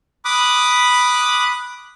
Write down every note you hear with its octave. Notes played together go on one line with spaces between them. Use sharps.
B5 D6 D#6 F#6